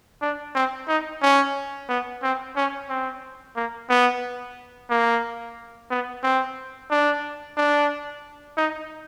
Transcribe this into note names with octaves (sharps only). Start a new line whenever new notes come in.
D4
C4
D#4
C#4
B3
C4
C#4
C4
A#3
B3
A#3
B3
C4
D4
D4
D#4